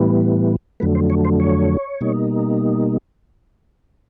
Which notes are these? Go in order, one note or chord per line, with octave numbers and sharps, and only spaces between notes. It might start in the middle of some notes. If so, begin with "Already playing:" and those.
Already playing: A2 E3 G3 B3
F2 D3 F#3 A3 B4
C5
C#5
C5
C#5
B2 G3 A#3 D#4